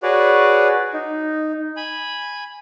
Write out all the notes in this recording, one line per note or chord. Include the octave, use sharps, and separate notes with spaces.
F#4 G#4 B4 C#5 D5
D#4
G#5 B5